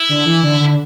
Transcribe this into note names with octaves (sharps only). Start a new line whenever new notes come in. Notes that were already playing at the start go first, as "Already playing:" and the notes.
Already playing: E4
D3
E3
D3
D3